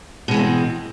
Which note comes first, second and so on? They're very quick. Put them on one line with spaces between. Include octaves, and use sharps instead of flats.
B2 G#3 E3 C4